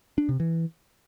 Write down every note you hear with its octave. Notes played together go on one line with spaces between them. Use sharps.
D4
C3
E3